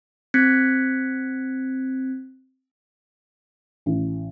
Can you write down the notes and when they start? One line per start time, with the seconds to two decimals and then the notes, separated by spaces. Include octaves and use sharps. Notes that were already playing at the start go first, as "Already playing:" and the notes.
0.34 C4 F#6 G#6 B6 C#7
3.86 A1